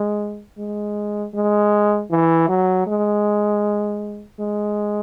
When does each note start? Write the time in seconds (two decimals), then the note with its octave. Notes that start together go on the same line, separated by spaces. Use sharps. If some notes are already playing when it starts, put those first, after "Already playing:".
Already playing: G#3
0.58 G#3
1.35 G#3
2.11 E3
2.49 F#3
2.87 G#3
4.40 G#3